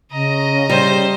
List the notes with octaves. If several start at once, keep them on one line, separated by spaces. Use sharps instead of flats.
C#3 D#5 A#5
G3 C5